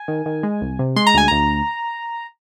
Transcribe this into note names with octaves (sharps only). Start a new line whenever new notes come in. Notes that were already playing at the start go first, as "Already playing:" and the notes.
Already playing: G#5
D#3
D#3
G#3
C2
C3
G#3 C6
A#5
D2 G#5
D2 A#5